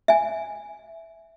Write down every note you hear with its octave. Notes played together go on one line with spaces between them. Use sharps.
E5 G#5